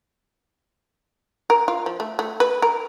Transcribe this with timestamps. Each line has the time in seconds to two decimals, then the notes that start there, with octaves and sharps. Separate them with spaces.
1.50 A#4
1.68 F4
1.86 F3
2.00 A3
2.19 A3
2.40 B4
2.62 A#4